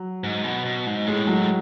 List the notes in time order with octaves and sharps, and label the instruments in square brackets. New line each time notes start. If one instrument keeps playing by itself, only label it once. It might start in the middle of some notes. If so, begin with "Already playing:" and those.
Already playing: [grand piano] F#3
[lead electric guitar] G#2
B2
B2
G#2
[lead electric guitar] A2 [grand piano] G#3
[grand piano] G#3
F#3